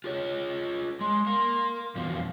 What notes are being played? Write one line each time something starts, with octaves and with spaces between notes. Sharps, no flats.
F4 G#4 C#5
G#3 C6
A#4 F5
F2 B2 E3 F5